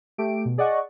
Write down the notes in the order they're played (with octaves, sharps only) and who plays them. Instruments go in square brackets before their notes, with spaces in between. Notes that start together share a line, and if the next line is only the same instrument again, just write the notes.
[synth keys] A3 G4 D7
B2
G#4 D5 D#5 F#5 C#6